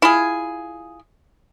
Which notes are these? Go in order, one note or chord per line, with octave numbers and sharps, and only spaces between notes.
E4 F4 G#4